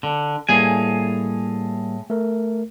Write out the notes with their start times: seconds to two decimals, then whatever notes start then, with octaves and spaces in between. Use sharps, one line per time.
0.03 D3
0.49 A2 G3 A#3 G#4 G#5
2.10 A3 A#4